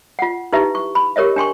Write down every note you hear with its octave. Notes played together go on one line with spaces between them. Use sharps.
F4 F#5
D#4 E4 G4 B4 E5
C#6
B5
G4 A#4 C#5 D#5 E5
D4 G5 C6 C#6